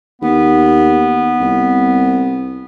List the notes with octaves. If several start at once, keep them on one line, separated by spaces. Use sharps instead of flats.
D#2 B3
C2